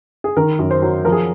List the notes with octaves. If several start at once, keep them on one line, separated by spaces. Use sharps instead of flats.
G#4
D#3 A#4
F#2
C5
F#3
F3 A#4
G#4